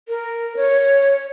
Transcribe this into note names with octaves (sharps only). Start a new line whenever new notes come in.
A#4
C#5